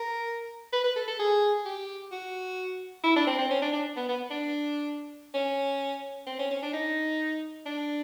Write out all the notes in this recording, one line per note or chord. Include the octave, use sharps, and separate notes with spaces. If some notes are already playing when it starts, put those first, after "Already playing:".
Already playing: A#4
B4
B4
A4
A4
G#4
G4
F#4
E4
D4
C4
C4
C#4
D4
D4
B3
B3
D4
C#4
C4
C#4
C#4
D4
D#4
D4